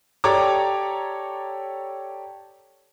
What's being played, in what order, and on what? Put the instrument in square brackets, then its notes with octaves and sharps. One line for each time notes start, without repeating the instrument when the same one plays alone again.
[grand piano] G4 A4 C#5 D5 A#5 D6